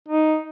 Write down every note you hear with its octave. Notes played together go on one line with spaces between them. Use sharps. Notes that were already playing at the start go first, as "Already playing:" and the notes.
D#4